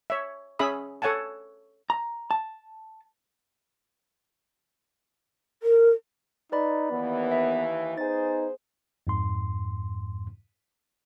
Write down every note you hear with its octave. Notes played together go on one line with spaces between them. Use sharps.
C#5 E5
C#4 G#4 E5 B5 D#6
A4 C#5 F#5 G#5 A5
A#5
A5
A#4
D#4 B4 D5 B5
D#2 E3 B3
E5
B3 D#4 G#4 C5 G#5 A6
F2 G#2 C6